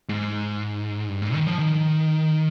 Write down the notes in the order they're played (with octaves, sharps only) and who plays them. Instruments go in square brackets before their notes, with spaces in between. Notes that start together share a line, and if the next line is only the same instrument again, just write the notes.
[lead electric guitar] G#2
G2
G#2
D#3
F3
D#3